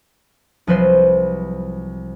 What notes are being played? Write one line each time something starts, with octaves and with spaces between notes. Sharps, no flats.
C2 F3 F#3 B4 C5 C7